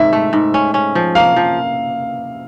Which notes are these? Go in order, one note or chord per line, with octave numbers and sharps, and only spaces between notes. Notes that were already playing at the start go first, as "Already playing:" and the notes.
Already playing: G#2 E5
A3
G#2
C#4
C#4
F3
A#3 F5
F3